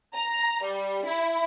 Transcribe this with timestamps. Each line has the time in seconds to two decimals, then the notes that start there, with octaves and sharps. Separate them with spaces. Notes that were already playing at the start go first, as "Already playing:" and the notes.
0.13 A#5
0.62 G3
1.05 E4